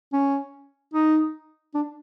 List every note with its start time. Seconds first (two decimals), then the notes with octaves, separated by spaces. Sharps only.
0.13 C#4
0.94 D#4
1.75 D4